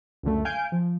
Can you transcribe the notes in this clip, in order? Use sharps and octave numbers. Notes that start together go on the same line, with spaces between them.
C#2 F#2 D3 A3
F5 G#5 G6 D7
F3